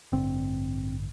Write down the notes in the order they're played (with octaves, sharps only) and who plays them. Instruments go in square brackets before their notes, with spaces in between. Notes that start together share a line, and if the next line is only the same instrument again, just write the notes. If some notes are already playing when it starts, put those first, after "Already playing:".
[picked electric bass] A1 G2 D3 C4